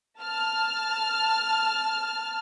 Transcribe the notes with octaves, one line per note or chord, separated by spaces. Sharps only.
A5 F6